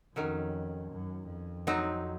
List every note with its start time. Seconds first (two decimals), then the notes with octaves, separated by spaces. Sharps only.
0.16 F2 D#3 F#3 C#4
0.91 F#2
1.29 F2
1.67 F#3 C4 D#4